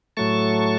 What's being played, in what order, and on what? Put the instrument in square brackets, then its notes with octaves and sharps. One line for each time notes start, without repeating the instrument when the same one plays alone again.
[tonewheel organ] A2 F#3 A3 A5 C#6